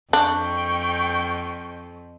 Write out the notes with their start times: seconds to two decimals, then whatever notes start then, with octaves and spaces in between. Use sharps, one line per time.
0.13 F2 D4 G5 C#6